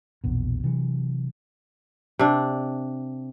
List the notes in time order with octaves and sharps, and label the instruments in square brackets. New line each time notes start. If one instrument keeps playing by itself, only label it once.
[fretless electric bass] A#1 E2 B2
C3 E3 F#3
[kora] C3 D4